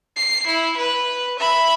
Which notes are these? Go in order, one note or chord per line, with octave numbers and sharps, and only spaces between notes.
C7
E4
B4
E5 B5